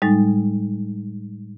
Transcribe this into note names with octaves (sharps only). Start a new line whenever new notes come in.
A2 G3 G#3 D#4 A6